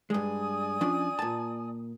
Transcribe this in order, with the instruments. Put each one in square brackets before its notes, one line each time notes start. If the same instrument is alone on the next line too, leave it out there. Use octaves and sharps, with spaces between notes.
[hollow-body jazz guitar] G2 G#3 [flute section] D5 G#5 D#6
[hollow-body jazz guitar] F3 C#4 D4
A#2 A5